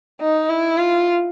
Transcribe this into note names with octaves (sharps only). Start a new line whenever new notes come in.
D#4
E4
F4